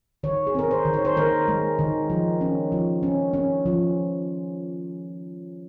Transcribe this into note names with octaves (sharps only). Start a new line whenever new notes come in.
D#3 C#5
G#4
C4 A#4
C5
D#3
C#5
C5
D#3 A#4
G#3
D#3
F3
C#4
F3
C#4
C#4
F3